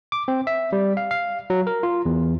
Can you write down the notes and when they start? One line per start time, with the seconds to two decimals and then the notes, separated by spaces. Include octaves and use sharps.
0.12 D6
0.28 C4
0.47 E5
0.73 G3
0.97 F5
1.11 F5
1.50 F#3
1.67 A#4
1.83 F4
2.05 E2